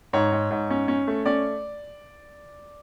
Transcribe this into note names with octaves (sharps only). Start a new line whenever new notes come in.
G#2 C#5
G#2
G#2
C#4
C#4
A3
C#4 D5